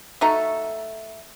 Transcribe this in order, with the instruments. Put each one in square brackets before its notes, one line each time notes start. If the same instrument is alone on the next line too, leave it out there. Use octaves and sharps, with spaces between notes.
[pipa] A3 D#4 F#4 A4